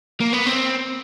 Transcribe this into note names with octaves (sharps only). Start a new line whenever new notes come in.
A#3
B3
C4